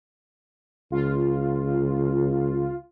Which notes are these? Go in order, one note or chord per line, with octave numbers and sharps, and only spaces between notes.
C#2 F4